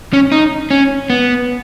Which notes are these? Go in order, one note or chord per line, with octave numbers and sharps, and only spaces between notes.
C#4
D#4
C#4
B3